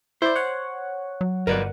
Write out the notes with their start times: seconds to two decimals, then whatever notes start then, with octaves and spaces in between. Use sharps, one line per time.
0.22 E4 C5 D5
0.36 C#5 F#5
1.21 F#3
1.47 G1 A#4 B4 D5 F#5